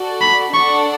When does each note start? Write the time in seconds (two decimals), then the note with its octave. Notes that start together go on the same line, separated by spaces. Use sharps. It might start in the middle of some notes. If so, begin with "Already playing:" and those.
Already playing: F#4 A4 D5
0.21 B5
0.53 D4 A4 D5 F#5 A5 C#6